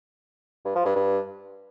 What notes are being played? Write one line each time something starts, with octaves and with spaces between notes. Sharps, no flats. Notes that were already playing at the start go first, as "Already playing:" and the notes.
G2
F3
G2
G2